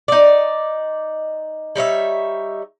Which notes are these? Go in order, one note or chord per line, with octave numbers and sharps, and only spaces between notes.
D#4 D5
G3 D#4 C#5 E5